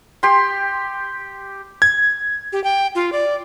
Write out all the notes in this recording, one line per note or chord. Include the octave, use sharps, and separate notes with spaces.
G4 C6
G#6
G4
G5
F4
D5